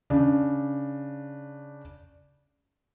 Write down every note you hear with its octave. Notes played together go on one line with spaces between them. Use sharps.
C#3 D4